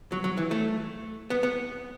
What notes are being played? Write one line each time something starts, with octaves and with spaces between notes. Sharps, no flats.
F#3
F#3
E3
A3
B3
B3